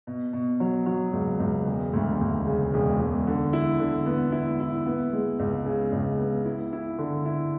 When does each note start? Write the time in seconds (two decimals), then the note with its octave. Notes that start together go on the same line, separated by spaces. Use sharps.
0.07 B2
0.33 B2
0.60 F#3
0.86 F#3
1.13 C#2
1.40 C#2
1.67 E1
1.93 D2
2.21 D2
2.47 C#3
2.74 E1
3.00 E1
3.27 D3
3.53 E4
3.80 D3
4.06 B3
4.32 E4
4.60 E4
4.86 B3
5.13 G#3
5.39 C#2
5.66 C#3
5.92 C#2
6.19 B3
6.45 E4
6.73 E4
6.98 D3
7.25 E4